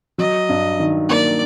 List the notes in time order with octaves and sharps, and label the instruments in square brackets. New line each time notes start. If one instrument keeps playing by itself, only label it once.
[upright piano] F#3 [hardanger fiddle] D#5
[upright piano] G2
D#3
[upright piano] A#3 [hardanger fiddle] D5